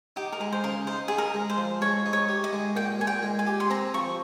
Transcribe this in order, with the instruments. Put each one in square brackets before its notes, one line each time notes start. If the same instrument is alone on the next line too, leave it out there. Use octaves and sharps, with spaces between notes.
[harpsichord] D#4 [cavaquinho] G4
[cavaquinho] A#4
[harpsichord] G#3 [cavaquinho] G#4
[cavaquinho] C5
[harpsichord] C#3 [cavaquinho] A#4
[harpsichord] D#4 [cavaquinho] C5
[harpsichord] D#4 [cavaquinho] G#4
[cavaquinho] A#4
[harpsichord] G#3
[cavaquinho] C5
[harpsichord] F3
[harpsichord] G#3 [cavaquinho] C#5
[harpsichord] D#4
[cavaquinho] C#5
[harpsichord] G4
[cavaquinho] D#5
[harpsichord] G#3
[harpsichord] A#2 [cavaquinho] G5
[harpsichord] A#2 [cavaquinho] G#5
[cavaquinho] G5
[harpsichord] G#3
[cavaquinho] G#5
[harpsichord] G4
[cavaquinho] C6
[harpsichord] C4 [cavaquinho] A#5
[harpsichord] F3 [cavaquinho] C#6